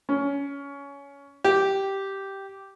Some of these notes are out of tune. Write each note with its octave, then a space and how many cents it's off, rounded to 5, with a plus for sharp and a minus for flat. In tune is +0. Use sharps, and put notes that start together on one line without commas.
C#4 +20
G4 -5